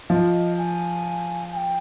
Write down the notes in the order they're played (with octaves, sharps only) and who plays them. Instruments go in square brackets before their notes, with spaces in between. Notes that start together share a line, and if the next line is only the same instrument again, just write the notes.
[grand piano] F3 [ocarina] D#5
[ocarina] G#5
G#5
G5